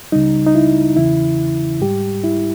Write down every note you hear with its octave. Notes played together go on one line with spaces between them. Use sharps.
C#2 C#3 G3 D#4
D#4
E4
E2 C#3 E3 E4
G#2 G3 G4
E4